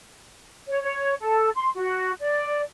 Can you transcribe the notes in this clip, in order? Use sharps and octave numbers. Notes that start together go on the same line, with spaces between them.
C#5
C#5
A4
C6
F#4
D5